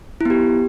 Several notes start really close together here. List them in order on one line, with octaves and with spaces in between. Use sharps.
E4 B3 G4